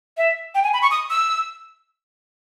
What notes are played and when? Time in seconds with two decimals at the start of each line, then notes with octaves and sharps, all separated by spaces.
0.17 E5
0.55 G5
0.64 G#5
0.73 B5
0.82 C#6
0.91 D#6
1.10 E6